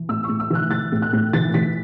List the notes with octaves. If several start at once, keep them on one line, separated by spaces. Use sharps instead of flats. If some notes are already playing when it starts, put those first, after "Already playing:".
Already playing: E3
A2 E6
A2 C#6
E6
E3 F#6
E3 A6
A2
F#6
A2
E3 A6
E3 B6